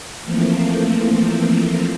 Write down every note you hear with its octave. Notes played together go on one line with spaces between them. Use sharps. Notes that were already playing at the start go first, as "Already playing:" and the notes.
E3 F3 A3 A#3 C4